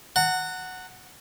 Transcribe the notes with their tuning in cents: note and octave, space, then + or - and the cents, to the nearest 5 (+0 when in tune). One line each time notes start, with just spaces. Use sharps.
F#5 +0 A#5 -45